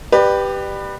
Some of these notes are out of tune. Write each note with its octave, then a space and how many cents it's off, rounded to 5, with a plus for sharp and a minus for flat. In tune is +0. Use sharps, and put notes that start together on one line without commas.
G4 +0 B4 +0 D5 +35